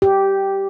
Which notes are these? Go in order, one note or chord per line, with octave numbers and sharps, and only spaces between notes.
G4